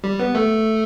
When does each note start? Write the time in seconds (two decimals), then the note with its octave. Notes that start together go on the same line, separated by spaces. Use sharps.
0.04 G3
0.20 B3
0.35 A3